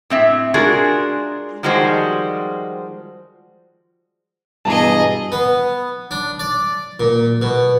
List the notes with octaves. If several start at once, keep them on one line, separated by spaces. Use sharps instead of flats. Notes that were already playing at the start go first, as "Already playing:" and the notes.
A2 C4 E5
G#3 D4 F4 F#4 G#4 A#4
D#3 F3 G3 G#3 F#4 C5
G2 B2 E3 G#4 D#5 A5 A#5
B3
D4
D5
A#2
B2